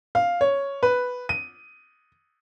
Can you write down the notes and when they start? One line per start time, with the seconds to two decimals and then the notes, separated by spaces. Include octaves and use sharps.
0.15 F5
0.41 C#5
0.83 B4
1.29 D#7